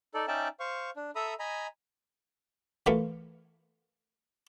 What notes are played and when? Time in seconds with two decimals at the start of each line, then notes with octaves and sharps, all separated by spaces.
0.14 D#4 A4 D5
0.28 C#4 D#4 D5 E5 G5 A5
0.60 C5 F5 C#6
0.96 D4
1.16 A4 E5 A#5 B5 D#6
1.39 D#5 G#5 A#5 B5
2.86 E3 A3 A#3 F4 C#6